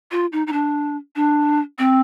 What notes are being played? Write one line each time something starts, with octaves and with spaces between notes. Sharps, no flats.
F4
D#4
D#4
D4
D4
C4